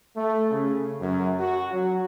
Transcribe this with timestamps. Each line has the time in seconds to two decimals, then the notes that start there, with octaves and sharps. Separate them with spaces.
0.16 A3
0.51 C#3
0.99 F#2
1.39 F#4
1.72 F#3